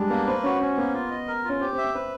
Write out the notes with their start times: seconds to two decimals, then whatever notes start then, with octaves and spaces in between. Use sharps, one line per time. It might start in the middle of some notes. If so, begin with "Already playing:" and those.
Already playing: G3 G#3 D4
0.10 A#3 B3
0.27 C4 B4
0.43 C#4 F#4
0.61 C4 C#4
0.77 A#3 B3
0.94 F4
1.11 D#5
1.28 A#4
1.44 C#4 F4
1.60 C4 G4
1.72 C4
1.78 E5
1.84 C4
1.94 C4 B4